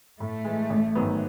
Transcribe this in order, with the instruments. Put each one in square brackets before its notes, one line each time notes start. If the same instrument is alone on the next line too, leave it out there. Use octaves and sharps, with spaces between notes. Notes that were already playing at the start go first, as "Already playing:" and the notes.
[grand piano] A2 [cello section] A3
[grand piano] E3 G#3
A1
G#2 D#3 F#3 B3